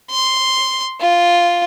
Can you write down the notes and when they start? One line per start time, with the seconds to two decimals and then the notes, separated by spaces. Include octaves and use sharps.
0.10 C6
1.01 F4